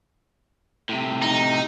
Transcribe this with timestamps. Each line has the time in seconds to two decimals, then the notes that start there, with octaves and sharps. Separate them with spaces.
0.89 A2 C3
1.22 D#4